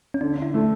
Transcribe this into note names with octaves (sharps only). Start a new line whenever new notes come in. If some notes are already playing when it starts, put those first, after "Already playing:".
C#4
D3 D4
D3 E4
A3